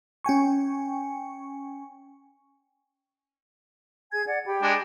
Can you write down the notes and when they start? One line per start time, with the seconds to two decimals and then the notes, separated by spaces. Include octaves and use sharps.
0.24 C#4 G5 G#5 C#6
4.12 G#4 G#5 G#6
4.27 D5 F#5
4.46 G4 G5 B5
4.62 G#3 D4